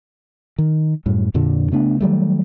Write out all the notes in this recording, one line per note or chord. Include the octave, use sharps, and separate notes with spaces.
D#3
F#2 A2 G3
F2 A#2 D3 D4
C#3 A3 B3 D4
D#3 F#3 G3 A3